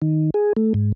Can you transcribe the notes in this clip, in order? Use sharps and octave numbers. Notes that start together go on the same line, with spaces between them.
D#3
G#4
A3
G#2